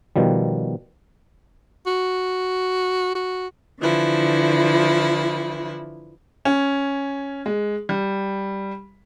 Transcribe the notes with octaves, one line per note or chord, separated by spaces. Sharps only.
B2 D#3 F3 G3
F#4
F#4
D3 E3 F3 E4
C#4
G#3
G3